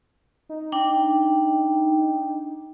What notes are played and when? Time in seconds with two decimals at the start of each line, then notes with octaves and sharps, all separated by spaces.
0.49 D#4
0.72 D4 G5